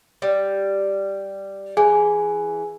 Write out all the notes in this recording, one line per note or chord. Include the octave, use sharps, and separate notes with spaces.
G3
E3 G#4 G#5